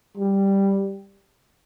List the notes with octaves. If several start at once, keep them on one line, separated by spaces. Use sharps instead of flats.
G3